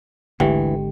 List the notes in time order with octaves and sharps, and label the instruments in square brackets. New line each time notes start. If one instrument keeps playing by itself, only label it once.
[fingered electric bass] G#1 D3 G#3 [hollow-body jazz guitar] D2 [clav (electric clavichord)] E3 [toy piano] G4 G5